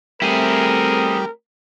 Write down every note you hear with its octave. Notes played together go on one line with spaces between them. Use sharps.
G3 A3 C4 E4 G#4 A#4